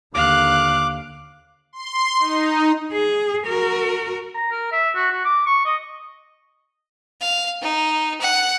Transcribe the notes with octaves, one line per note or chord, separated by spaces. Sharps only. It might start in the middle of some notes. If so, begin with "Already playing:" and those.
D#2 D3 F5 D6 F#6
C6
D#4
G#4
F#4 A#4
A#5
A#4
E5
F#4
F#4
D6
C#6
D#5
F5
D#4
F#5